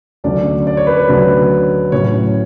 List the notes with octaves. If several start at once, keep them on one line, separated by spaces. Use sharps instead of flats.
D2 D3 F#3 C#4 D4 D5
D5
C#5
B4
C#5
D2 D3 F#3 C#4 B4
A2 F#3 C#4 C#5